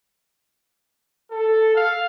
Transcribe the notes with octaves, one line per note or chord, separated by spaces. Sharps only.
A4
F5